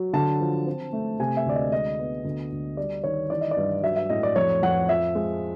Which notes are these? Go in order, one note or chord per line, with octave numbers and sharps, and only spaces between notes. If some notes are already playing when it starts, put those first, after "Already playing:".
Already playing: F#3
D3 A5
F3
C4
A3
C3 G#5
E5
D2 D5
D#5
G#3 D#5
B3
D2
D2
G3 D5
D#3 C#5
E3 D5
D#5
D5
G2
F#3 E5
E5
A2 D#5
D5
F2 C#5
F2 F#5
F3 E5
G#3